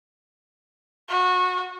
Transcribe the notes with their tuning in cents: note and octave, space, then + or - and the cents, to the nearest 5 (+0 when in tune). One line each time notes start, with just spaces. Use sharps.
F#4 -20